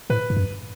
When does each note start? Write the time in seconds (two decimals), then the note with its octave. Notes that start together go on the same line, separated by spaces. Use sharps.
0.10 A2 B4
0.30 G2
0.37 F#2